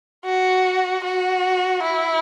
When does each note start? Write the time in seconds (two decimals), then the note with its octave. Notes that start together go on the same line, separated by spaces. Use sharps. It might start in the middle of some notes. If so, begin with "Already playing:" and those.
0.25 F#4
1.04 F#4
1.83 E4